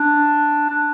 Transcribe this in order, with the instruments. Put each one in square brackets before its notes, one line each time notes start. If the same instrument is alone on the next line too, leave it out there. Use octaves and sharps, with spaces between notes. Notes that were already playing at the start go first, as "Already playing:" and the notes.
Already playing: [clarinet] D4
D4